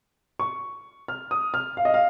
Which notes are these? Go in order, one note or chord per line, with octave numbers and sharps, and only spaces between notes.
C#6
F6
D#6
F6
F5
D#5
F5